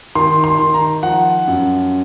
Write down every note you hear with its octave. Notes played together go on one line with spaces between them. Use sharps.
D#3 C6
C6
D#3
A#5
F3 F#5
F#2